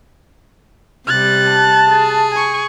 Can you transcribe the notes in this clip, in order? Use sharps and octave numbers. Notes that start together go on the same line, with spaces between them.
C3 G3 F#6 A6
A5
G#4
G#5 C#6